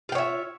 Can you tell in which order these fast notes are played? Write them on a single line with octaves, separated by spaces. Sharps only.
F4 G5 C#5 E5